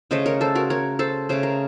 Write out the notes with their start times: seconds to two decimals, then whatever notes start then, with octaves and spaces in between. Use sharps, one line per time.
0.11 C#3 A3 C5 D#5
0.26 A#4 C#5
0.41 A4 C5
0.55 F#4 A#4
0.70 A#4 C#5
0.99 A4 C5
1.29 C#3 A3 C5
1.43 A#4